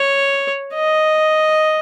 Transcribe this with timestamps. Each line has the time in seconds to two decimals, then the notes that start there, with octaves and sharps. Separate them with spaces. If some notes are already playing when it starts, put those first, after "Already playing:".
Already playing: C#5
0.75 D#5